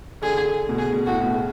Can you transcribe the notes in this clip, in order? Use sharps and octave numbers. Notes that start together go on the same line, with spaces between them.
D3 G#4
B2
C#3 G#4
B2
A2 F#4
B2
C#3